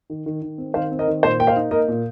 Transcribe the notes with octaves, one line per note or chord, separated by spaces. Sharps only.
D#3
D#3
D#3
C4
D#3 C5 F5
C4
A#4 D#5
D#3
A#2 C5
A#3 G5
C5 F5
D#4
A#3 A#4 D#5
A#2